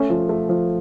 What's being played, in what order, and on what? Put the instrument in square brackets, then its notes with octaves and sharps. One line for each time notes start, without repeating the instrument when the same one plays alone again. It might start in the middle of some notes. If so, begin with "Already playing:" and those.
Already playing: [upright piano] A3 [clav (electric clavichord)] C#4
[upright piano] F3
A3
F3